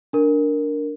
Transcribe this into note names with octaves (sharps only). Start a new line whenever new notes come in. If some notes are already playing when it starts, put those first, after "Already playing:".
D4 A#4